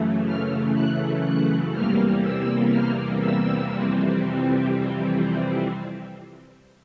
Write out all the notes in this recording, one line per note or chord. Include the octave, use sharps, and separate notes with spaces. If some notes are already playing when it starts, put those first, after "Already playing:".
Already playing: F#2 C#3 E3 A3
F6
F#6
F#6
E2 C3 E3 G3 A#3 F6
E6
F6
E6
F2 C3 E3 G3 C4